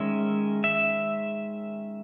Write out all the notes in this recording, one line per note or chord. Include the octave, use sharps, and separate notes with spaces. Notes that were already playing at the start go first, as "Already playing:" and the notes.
Already playing: D#3 G#3 C#4 E5
E5